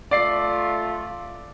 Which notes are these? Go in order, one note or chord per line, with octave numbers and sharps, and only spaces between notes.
A3 F4 D5 C7